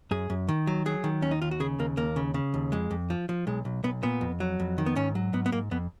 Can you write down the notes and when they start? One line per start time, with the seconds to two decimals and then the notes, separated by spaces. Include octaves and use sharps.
0.11 F#2 G#4
0.30 F#2
0.48 D#3
0.67 F#3
0.86 F#3 G#4
1.04 D#3
1.22 D#2 C#4
1.31 D#4
1.42 D#2 F4
1.51 F#4
1.60 C#3 G#4
1.79 D#2 A#3
1.97 D#2 A#3
2.16 C#3
2.34 C#3
2.54 D#2
2.72 F2 G#3
2.91 F2
3.10 F3
3.29 F3
3.47 B1 G#3
3.65 B1
3.83 B1 B3
4.03 A#2 B3
4.21 F2
4.40 F#3
4.60 F2
4.78 D#3
4.86 B3
4.96 G#2 C#4
5.15 F#3
5.33 G#2 B3
5.46 B3
5.52 G#2 A#3
5.71 F2 B3